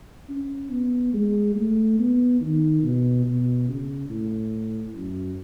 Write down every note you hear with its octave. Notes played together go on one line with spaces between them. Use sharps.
C#4
B3
G#3
A3
B3
D#3
B2
B2
C#3
A2
F#2